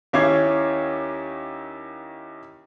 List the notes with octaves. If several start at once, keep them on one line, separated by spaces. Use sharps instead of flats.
D#2 C#4 E4 D6 G#6 C7